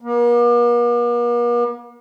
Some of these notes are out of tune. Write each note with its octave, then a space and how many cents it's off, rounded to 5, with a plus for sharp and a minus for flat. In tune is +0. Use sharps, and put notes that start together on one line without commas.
A#3 +45